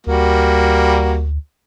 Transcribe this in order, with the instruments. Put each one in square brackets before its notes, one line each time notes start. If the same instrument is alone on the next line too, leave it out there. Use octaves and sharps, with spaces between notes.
[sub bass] D2 [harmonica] G3 A#3 F#4